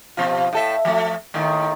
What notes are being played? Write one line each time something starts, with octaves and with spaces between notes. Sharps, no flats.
B2 F3 F4
A2 A4 E5
F3 A3
D#2 A2 D#3